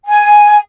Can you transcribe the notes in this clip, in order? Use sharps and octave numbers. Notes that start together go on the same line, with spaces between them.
G#5